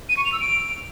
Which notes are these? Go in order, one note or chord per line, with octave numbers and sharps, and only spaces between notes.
D#7
C#6
F7
E6
D7